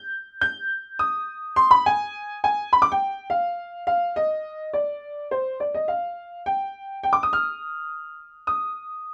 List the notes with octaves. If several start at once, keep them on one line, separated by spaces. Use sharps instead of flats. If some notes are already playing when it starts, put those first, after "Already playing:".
Already playing: G6
G6
D#6
C6
B5
G#5
G#5
B5
D6
G5
F5
F5
D#5
D5
C5
D5
D#5
F5
G5
G5
D6
D#6
F6
D#6